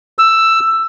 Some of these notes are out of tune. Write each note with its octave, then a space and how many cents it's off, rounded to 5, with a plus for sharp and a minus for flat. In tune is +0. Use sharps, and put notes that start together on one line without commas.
E6 +10